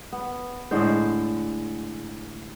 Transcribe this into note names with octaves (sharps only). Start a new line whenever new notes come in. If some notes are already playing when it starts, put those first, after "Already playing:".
B3
A2 D3 G#3 C5